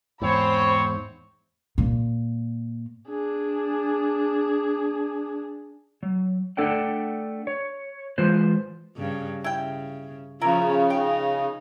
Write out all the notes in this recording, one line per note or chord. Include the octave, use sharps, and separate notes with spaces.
E2 G#2 C4 C5 C#5 B5
A#2
D4 G#4
F#3
A3 D4 A4 D5 F#5 G5
C#5
E3 G#3 F4 B4 C5
G2 C#3
C#3 E4 G5
C#3 F3 C#4 E4 A#4
D#4 G5